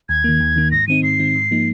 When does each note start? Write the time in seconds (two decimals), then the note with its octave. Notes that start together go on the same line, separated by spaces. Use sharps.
0.09 D#2 G#6
0.24 D#3 A#3
0.40 D#2
0.56 D#3 A#3
0.71 G#2 A#6
0.88 D#3 C4 D#4 D#7
1.03 G#2 C7
1.19 D#3 C4 D#4
1.35 G#2
1.51 F3 A#3 D#4